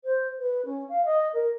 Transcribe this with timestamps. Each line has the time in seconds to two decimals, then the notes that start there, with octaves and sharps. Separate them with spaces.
0.04 C5
0.39 B4
0.65 C#4
0.89 F5
1.05 D#5
1.33 A#4